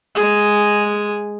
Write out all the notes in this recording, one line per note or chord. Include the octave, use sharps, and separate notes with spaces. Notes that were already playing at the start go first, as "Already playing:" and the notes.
G#3 G#4